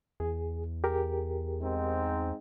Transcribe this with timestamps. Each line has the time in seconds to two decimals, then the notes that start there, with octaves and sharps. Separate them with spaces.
0.20 E2 G#4
0.84 G4 G#4 A#4
1.61 G#2 C4 D#4